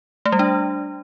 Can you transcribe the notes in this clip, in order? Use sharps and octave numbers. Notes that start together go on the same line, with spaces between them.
A3
G3
D4